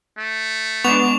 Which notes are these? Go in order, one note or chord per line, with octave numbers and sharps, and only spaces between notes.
A3
G#3 B3 D4 C#6 F7